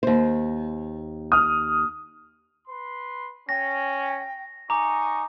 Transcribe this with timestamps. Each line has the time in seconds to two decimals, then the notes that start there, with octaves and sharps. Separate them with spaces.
0.03 D#2 C5
1.32 D#6 F6
2.68 B4 C6
3.49 C#4 G5 A#6
4.70 D#4 G#5 A#5 C#6 D6